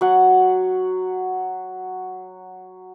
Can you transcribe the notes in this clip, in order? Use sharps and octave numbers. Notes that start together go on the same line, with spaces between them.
F#3 F#5